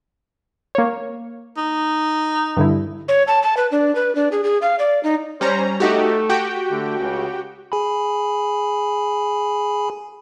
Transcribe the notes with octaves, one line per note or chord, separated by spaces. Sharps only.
A#3 C#5
D#4
G2 D3 E4
C#5
A5
A5
B4
D4
B4
D4
G#4
G#4
F5
D5
D#4
G3 C#4 C5 A#5
A3 D#4 F#4 G4 A4
F#4 G4 G5
D3 A3
C#2 C#3
G#4 G#5 B5